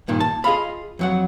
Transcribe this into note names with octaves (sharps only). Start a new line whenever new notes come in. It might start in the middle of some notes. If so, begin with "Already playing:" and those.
G2 A#2 D#3
A5
F4 G#4 D#5 F5 B5
F2 F#3 F#5